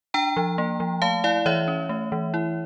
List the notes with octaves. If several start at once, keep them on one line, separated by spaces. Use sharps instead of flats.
D4 G5 A#5
F3
A#3
F3
A3 F5 A5
E4 D5 F5
E3 C#5 E5
C#4
A3
E3
E4